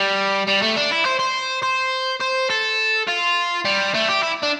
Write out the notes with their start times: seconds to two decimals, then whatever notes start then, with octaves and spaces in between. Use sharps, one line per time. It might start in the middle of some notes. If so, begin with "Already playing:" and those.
Already playing: G3
0.48 G3
0.63 A3
0.77 D4
0.92 E4
1.06 C5
1.20 C5
1.63 C5
2.21 C5
2.50 A4
3.07 F4
3.65 G3
3.95 A3
4.09 G4
4.23 E4
4.43 D4